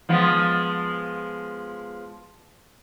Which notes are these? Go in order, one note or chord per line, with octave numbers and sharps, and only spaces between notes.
F3 G#3 B3